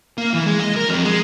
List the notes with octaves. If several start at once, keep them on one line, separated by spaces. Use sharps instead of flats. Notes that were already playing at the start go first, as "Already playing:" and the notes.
A#3
E3
G#3
D#5
A#4
F2
G#3